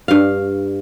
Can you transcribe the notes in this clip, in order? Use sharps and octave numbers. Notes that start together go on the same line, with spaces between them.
G2 F5